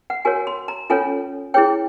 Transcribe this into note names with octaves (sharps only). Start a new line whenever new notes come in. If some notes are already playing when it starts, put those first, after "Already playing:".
F#5
F#4 A#4 C#5 G#5
C6
A#5
C#4 F4 A4 C#5 G#5
E4 G#4 C#5 G5